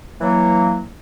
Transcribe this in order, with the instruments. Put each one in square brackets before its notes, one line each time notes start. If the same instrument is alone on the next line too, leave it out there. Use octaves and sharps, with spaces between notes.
[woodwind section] E3 F#3 A#3